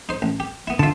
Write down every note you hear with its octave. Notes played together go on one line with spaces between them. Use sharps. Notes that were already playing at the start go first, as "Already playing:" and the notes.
D#4 C5
A1
G4
B3 E4
D3 F4 E5 A5